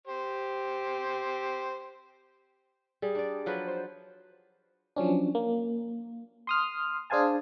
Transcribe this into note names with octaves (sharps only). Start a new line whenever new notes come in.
G4 C5
G3 G#4
D4 D5
F3 F#3 B4
C5
F3 F#3 C#4 D4
A#3
C6 D#6 F6
D4 G#4 C5 F5 G#5 A5